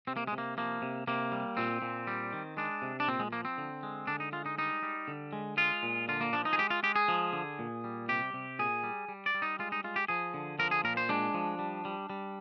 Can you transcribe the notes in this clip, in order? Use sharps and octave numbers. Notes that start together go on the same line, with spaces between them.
C3 C4
A#3
C3 G#3
A#3
F3 A#3
C3
C3 A#3
G3
A#2 C4
A#2
G3
D#3
G#3 D4
C3
D4
A#2 C4
G#3
F3 A#3
C4
D3
G#3
D3 D4
D#4
G#3 F4
D#4
G3 D#4
G3
D3
G#3
G#3 F4
A#2
D3 F4
A#3
F3 D4
D#4
G#4
G#3 G4
F4
G#3 G4
G#4
F3
D3
A#2
G3
C3 G4
C3
A#2 G#4
G3
G3
D5
G3
D#4
G#3 F4
D#4
G#3 F4
G4
F3 G#4
D3
F3 A#4
G#4
A#2 A#4
C5
G#3 D4
F3
G3
G3
G3